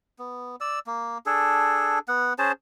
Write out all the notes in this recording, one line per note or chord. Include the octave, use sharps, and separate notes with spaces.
B3
D5 E6
A#3
D4 G#4 A4
B3 F#5
C#4 G#4 C5 A5